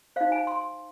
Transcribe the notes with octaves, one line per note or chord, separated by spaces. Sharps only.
D#4 C5 F5
G#5
C6